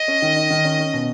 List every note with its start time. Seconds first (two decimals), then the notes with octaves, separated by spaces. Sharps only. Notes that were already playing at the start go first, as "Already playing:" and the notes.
Already playing: D#5
0.08 C#4
0.22 D#3
0.36 D#4
0.50 D#3
0.65 C#4
0.79 C#4
0.94 B2